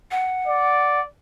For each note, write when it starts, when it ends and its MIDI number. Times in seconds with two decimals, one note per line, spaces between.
0.11 1.01 78
0.48 1.03 74